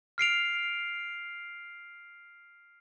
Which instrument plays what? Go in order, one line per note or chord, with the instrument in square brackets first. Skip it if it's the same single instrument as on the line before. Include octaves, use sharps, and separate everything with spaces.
[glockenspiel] F6 C7 D7 F7